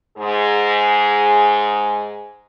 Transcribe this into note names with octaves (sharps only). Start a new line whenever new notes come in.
G#2 G#4